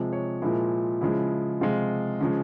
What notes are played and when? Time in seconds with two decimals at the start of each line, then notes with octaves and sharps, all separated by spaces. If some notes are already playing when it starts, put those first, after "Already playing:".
Already playing: C3 F3 G#3
0.13 C#5
0.42 A#2 F3 G#3 E4
1.01 C#3 F3 G#3 E4
1.61 C3 F3 G#3 F4
2.20 C#3 F3 G#3